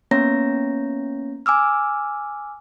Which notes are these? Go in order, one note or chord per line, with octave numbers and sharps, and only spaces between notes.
A#3 B3 C#4 C#5 A#5 A#6
G#5 D6 E6 F6